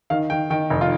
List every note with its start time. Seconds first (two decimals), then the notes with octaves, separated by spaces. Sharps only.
0.10 D#3 F5
0.30 D#3 G5
0.50 D#3 G5
0.70 F1
0.81 F4